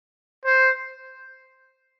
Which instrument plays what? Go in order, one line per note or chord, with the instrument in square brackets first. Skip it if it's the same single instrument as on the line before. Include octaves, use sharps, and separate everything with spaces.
[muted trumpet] C5